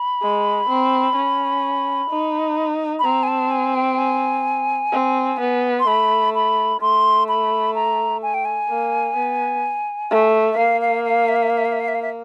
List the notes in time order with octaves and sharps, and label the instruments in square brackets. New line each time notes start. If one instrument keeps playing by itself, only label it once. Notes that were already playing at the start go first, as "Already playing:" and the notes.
Already playing: [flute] B5
[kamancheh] G#3
C4
C#4
D#4
[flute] B5
[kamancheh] C4 [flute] A#5
[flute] G#5
A5
G#5
G5
G#5
[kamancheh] C4
B3
[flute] C6
[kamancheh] A3 [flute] B5
[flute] B5
[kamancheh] A3 [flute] C6
[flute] B5
A#5
G#5
G5
G#5
[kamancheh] A#3
B3
A3
[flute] E5
[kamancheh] A#3 [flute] F5
[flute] F5
F5
E5
F5
E5
F5
E5
F5
E5
F5
E5
F5
E5